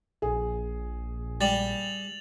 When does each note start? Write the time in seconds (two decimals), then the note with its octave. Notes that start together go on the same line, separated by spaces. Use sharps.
0.22 A#1 G#4
1.41 G3 A6 F7 F#7